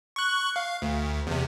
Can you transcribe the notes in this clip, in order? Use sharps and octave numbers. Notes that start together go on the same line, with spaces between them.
C#6 F#6
F5
D2
E2 C3